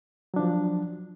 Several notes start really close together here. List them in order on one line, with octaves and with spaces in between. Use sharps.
F#3 D4 F3